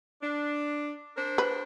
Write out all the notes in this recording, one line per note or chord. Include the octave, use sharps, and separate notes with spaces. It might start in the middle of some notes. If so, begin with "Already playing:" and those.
D4
D4 A#4 C5
B4